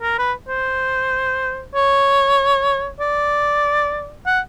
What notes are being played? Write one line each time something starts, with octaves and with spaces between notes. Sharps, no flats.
A#4
B4
C5
C#5
D5
F#5